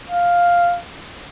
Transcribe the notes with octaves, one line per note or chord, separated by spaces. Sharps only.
F5